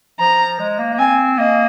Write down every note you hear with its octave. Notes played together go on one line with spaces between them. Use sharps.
F3 A#5
G#3
A#3
A#3
C4 G#5
A#3 D#5